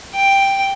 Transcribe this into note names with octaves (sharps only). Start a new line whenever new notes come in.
G5